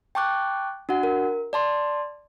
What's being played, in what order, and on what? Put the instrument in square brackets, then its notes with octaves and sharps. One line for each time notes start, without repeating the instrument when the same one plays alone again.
[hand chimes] G5 A5 C#6 D6 F#6
D4 F#4 F#5
A#4
D5 A5 C6